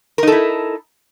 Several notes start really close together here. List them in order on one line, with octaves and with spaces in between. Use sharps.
A#4 D#4 A4 E4